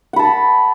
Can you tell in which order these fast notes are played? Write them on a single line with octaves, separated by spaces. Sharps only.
F#5 B5 A5